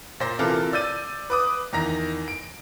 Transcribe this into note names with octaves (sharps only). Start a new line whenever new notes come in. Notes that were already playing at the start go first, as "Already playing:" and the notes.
A#2 C5 A#6
C3 E3 F4 A4 A#4
D5 E6 G6 A6 D#7
B4 D6 D#6
E2 D#3 A#5 A#6
D7